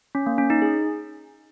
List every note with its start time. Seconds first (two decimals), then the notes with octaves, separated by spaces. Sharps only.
0.15 C#4
0.26 A#3
0.38 C#4
0.50 D#4
0.62 G#4